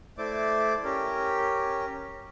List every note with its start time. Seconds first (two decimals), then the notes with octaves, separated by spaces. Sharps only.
0.18 A3 E4 C5 D5 D6
0.84 C#4 G4 A#4